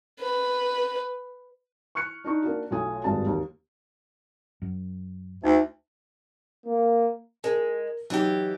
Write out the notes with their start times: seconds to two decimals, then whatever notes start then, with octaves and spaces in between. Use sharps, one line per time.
0.20 B4
1.95 C#6 F6 F#6 C#7
2.24 D4 D#4 C#6
2.43 A#3 D4 F#4
2.71 B1 A3 F4 F#4 G#5 D#6
3.04 G#1 G2 G#3 A5
3.26 D#2
4.62 F#2
5.44 D2 D#4
6.65 A#3
7.44 G#3 A#4
8.10 E3 F#3 D#4 G4